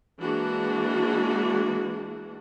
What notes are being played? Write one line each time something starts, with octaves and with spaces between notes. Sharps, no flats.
E3 G#3 A#3 D4 F#4